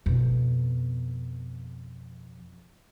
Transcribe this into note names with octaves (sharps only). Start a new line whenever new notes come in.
F2 B2